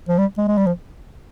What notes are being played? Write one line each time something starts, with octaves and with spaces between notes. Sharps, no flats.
F3
G3
G#3
G#3
G3
F3